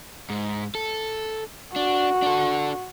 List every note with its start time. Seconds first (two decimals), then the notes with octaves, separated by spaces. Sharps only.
0.30 G#2
0.75 A4
1.76 D4 F#4
2.22 D4 A4